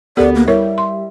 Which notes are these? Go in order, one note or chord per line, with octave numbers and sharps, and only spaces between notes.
D2 B3 G4 A4 A#4 D5
A#3
G3 E4 A#4 C#5 E5
C6